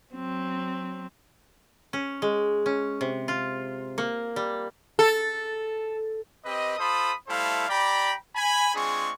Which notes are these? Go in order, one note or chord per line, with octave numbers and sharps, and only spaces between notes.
F#3 C4
C#4
G#3
C#4
C3
F4
A#3
G3
A4
C4 G4 B4 D#5
F4 A4 C5 B5 D#6
G3 A3 E4 A4 C5 F5
G4 D5 G5 A#5 B5
G#5 B5
G#3 C4 D4 F4 G#4 C#6